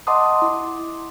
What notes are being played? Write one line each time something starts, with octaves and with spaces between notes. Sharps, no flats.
D#5 F#5 A5 C6 D6 D#6
E4 D6